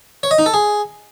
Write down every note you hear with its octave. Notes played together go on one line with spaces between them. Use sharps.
C#5
D#5
D#4
A4
G#4